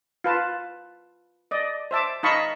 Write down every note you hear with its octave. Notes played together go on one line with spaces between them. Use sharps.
F4 B4 A5
D5 D#5
C5 E5 A5 D6
D#4 D#5 F5 A5 B5 C#6